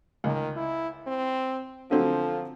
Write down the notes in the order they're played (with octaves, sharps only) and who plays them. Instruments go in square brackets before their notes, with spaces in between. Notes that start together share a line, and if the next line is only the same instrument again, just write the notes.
[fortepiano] C#2 [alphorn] D#3
[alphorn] E4
C4
[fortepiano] D3 F#3 C4 [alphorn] F3 [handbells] A4